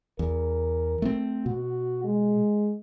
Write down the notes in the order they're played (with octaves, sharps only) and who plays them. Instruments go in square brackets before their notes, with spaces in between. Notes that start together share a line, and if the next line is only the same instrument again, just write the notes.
[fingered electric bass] E2 [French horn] A#4
[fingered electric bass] A3 B3 C4
[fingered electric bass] B2 [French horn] F#4
[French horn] G#3